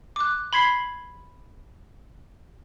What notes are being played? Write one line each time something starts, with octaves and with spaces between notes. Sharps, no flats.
D6 F#6
B5 C6 G#6 B6 C7